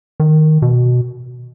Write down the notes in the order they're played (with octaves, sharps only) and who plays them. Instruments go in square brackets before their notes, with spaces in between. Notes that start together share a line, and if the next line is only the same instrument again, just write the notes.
[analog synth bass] D#3
B2